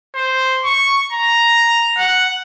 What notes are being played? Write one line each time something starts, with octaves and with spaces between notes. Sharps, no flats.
C5
C#6
A#5
F#5